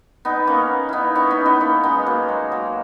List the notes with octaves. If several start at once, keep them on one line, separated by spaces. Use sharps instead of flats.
B3 D#4
A#3 C#4
B3 D#4 E4
C#4 E4
B3 D#4
B3 D#4
A#3 C#4
G#3 B3
F#3 A#3
G#3
F#3